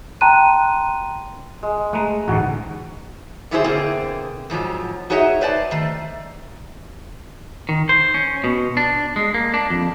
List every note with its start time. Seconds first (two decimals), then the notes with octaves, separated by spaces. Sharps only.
0.21 G5 A5 A#5 C6 F#6 D#7
1.63 G#3
1.93 G#3 A3 B4 A#5
2.28 A1 D2 G#2 F#4
3.51 D3 F#3 E4 G4 G#4 C5
3.64 B2 D3 A#3 C4 G#4
4.50 F2 G#2 F3 F#3
5.10 D#4 F#4 G#4 C#5 D#5 E5
5.41 B4 C5 D5 G5 A5
5.71 D#3 A3
7.69 D#3
7.89 C5
8.14 C#4
8.44 B2
8.77 D4
9.16 G#3
9.34 A#3
9.54 D4
9.70 F2